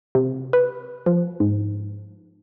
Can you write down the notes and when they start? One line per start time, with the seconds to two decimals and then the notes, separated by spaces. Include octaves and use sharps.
0.15 C3
0.53 B4
1.06 F3
1.40 G#2